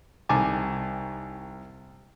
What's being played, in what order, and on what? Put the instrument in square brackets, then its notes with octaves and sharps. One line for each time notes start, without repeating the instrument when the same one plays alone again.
[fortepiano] C2 D#3 G#5 A5 D6